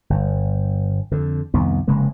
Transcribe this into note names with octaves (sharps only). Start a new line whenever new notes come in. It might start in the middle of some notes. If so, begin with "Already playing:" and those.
G1
F2 D3
C2 F2 D#3 B3
F1 C#3 G#3 A#3